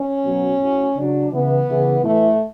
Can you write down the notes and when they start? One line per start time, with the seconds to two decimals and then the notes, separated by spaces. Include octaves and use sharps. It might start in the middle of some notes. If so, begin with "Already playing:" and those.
Already playing: C#4
0.25 B2 F#3
0.61 A2 F#3
0.96 C#3 F#3 D4
1.32 C#3 E3 B3
1.68 C#3 E3
2.04 A2 E3 A3